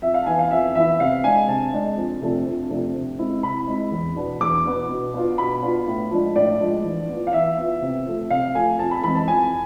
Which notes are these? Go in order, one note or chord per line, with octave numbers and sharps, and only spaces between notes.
F2 E5
F5
A5
E3 B3 E4 G#5
F5
F2 E5
E3 B3 E4 E5
C3 F5
G#3 D4 G#5
C3 A5
G#3 D4
F2
C3 F3 A3 D4
F2
C3 F3 A3 D4
C3
G#3 C4 E4
C3 B5
G#3 C4 E4
E2
B2 B3 D4
E2 D6
B2 B3 D4
B2
B3 D4 F4
B2 B5
B3 D4 F4
A2
F3 G#3 D4
A2 D5
F3 G#3 D4
E3
B3 F4
F5
E3 E5
B3 F4
C3
F3 A3
C3 F5
F3 A3 G#5
F2 A5
B5
E3 G#3 C4 B5
A5
F2 G#5